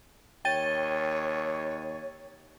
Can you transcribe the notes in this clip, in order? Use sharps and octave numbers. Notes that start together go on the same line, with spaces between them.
D#2 C#5 G5 A6 D#7